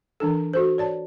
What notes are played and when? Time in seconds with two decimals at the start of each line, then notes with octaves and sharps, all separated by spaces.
0.20 E3 D4 A4
0.53 F#4 A4 C5
0.78 C#5 D5 A5